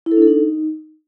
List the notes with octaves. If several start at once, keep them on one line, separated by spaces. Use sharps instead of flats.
E4
A4
D4
A4
D#4